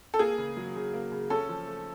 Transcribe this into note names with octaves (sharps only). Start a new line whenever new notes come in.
A4
A#3 G#4
C#3
F#3
C#3
A#3
C#3
C#4 A4
F3
A3